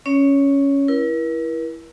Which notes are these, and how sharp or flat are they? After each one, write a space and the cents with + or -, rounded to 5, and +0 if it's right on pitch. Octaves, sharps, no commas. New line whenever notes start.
C#4 +0 C#5 +15
E4 +10 A#4 +45